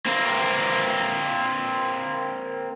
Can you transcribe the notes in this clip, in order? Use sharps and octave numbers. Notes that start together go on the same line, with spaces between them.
A#3 C4